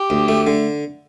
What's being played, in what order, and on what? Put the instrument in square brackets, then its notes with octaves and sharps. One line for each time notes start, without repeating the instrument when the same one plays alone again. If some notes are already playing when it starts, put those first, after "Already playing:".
Already playing: [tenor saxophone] G4
[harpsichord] D2
A3
D3